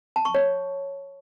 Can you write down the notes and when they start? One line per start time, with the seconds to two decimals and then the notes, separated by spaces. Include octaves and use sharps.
0.16 A5
0.25 C#6
0.35 C#5